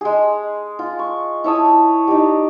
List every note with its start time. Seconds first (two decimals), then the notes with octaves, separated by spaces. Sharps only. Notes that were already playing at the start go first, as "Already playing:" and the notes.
0.01 G#3 G#4
0.79 F4
0.99 C#6
1.44 E4 C#5 A5 D#6
2.07 G3 D#4